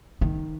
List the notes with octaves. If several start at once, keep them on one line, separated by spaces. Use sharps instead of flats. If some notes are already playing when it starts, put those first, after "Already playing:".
D#3